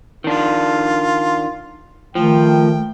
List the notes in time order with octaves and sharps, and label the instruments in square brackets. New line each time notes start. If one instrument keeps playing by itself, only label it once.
[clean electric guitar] D#3 D4 [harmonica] F4
[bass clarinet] D#3 [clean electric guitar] F3 [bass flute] A3 [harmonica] G5